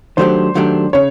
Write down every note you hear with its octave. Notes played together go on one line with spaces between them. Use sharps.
D#3 F#3 A3 D4 G4 C5
D#3 F#3 A3 D4 G4
C#3 C#5